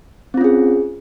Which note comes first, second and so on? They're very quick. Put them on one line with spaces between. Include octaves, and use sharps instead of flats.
C4 F4 C#4 G#4